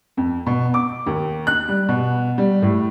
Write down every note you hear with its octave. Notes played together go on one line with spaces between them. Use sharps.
F2
B2
D6
D#2
F#6
G3
B2
G3
A2